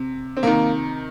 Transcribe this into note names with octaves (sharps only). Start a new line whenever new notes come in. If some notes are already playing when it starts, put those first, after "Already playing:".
Already playing: C3
C4
C3 D#3 A#3